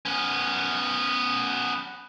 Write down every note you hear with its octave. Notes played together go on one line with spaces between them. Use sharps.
B3 C#4